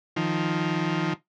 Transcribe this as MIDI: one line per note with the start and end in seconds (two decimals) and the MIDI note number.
0.16 1.13 51
0.16 1.13 53